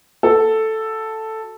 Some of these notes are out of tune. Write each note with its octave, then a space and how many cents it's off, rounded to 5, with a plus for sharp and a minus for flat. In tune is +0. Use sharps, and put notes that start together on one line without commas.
F#4 +0 A4 +0